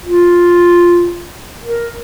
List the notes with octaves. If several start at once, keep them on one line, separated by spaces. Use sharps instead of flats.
F4
A#4